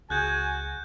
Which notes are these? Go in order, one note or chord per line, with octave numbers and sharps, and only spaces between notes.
C#2 F#4 G#4 G#5 F#6 G6